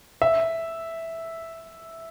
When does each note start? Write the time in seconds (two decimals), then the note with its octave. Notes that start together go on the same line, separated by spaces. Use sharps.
0.22 E5